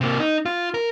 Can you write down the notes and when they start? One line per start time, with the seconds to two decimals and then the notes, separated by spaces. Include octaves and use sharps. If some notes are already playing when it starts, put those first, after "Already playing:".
0.01 C3 A#3
0.20 D#4
0.46 F4
0.74 A#4